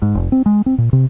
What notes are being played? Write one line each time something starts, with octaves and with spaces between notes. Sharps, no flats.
G#2
F1
C4
G#3
C4
A#2
C3